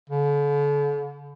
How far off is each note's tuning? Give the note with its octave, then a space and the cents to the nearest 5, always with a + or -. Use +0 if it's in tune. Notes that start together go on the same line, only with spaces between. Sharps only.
D3 -40